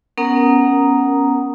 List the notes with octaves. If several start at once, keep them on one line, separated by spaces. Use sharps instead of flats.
B3 C#4 A#4 F#5 A#5 D#6